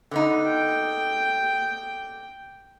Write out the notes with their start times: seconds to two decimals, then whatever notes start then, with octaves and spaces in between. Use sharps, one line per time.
0.11 D3 B3 D#4
0.47 G5